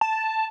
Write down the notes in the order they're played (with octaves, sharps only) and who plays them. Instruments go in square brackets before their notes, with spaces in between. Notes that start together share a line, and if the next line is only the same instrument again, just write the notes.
[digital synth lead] A5